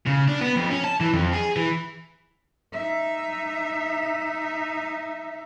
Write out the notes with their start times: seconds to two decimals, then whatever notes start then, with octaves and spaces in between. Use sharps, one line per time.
0.07 C#3
0.28 D4
0.41 B3
0.56 F2
0.71 C#4
0.84 A5
1.01 E3
1.14 F2
1.33 G#4
1.56 E3
2.73 D#4 E5